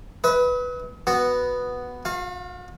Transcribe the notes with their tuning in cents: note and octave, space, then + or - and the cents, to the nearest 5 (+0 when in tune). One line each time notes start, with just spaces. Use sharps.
B4 +0 D#5 +45
B3 +0 F#4 +0
F#4 -45 F5 +0